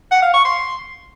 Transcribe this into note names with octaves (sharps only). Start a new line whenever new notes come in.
F#5
F5
C#6
C6